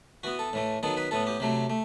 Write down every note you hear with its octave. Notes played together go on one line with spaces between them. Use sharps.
E3 B3 F#4
A4
A2 E3 A3
D#3 F#3 B3 A4
B4
A2 E3 B3 A4
G4
C3 F#3 A3
A3